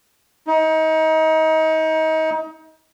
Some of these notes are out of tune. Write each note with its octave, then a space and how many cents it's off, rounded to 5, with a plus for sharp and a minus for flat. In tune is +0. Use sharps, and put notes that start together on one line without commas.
D#4 +30